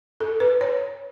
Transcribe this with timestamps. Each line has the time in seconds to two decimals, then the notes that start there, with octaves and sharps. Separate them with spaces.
0.20 A4
0.40 B4
0.61 C#5